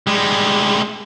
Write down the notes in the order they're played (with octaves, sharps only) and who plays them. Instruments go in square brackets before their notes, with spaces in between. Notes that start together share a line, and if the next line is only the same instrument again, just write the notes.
[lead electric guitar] G3 G#3